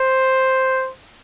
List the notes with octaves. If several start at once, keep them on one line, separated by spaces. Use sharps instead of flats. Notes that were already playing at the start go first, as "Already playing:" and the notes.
Already playing: C5